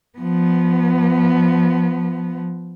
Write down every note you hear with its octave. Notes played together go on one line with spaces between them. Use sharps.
F3 B3